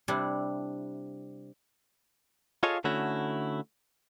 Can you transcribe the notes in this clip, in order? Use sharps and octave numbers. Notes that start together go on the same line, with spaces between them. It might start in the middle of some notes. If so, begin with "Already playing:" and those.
C3 G3 D4 E4
F4 G#4 A4 C#5 D#5 F5
D3 A3 C#4 E4 F#4